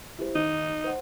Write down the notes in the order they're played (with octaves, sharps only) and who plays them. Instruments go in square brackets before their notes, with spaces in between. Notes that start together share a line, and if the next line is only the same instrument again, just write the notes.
[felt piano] E4 G4 C5
[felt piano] D#3 [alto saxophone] D#4
[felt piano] C5 F#5